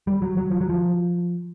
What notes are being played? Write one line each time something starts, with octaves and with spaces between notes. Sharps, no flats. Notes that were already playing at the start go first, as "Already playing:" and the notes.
G3
F#3
F#3
F3
F#3
F3